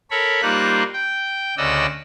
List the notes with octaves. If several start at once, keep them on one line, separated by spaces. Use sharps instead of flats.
A4 A#4 C#5 B5
G3 A#3 D#4 F4 C5 F#6
G5
D2 C#3 D5 D#5 F#5 E6